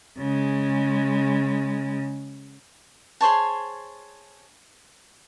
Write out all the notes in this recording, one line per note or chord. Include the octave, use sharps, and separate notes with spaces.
C#3 G#3
G#4 C5 C#5 A5